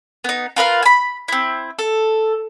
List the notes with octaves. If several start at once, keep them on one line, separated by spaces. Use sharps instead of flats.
B3 D#4
F4 A#4 B4 F5
G#5 B5
C4 E4
A4